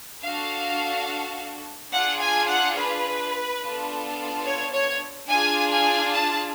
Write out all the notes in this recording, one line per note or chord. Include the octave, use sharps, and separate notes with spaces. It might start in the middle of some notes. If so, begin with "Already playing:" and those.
D4 F#4 A4 F5
D4 F4 G#4 F#5
G#5
F#5
B4
B3 D4 F4 A4
C#5
C#5
D4 F4 G#4 G#5
G#5
A5